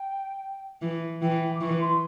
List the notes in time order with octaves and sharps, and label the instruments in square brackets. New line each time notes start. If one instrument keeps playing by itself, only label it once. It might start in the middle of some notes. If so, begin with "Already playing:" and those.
Already playing: [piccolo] G5
[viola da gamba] E3
[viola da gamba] E3 [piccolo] G5
[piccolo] D6
[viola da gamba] E3 [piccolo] C#6
[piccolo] C6